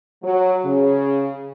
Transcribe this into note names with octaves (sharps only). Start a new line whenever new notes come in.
F#3
C#3